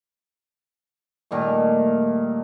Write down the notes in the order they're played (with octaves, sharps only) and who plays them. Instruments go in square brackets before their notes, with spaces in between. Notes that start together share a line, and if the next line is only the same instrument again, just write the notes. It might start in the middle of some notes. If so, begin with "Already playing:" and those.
[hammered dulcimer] A#2 D#3 G3 A3